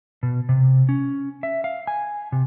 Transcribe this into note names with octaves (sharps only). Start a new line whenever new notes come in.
B2
C3
C#4
E5
F5
G#5
C3